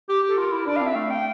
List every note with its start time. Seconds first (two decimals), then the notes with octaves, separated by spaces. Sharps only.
0.09 G4
0.23 G4
0.28 A4
0.38 F4 A#4
0.52 E4
0.66 D4 D5
0.76 C4 F5
0.86 E5
0.95 A3 F5
1.10 G5